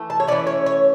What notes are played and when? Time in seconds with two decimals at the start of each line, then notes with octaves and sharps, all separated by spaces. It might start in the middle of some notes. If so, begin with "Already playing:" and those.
Already playing: E3 A3
0.10 A5
0.20 C#5
0.27 E3 A3 C#4 D5
0.47 C#5
0.66 C#5